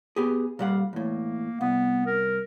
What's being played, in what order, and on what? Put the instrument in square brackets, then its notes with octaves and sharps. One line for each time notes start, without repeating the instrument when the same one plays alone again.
[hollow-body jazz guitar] B3 G4 G#4
[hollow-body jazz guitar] A#2 G3 F#5 [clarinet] F5
[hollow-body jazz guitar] E2 A2 [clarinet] A#3
[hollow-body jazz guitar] C2 [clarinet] B3
[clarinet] A#4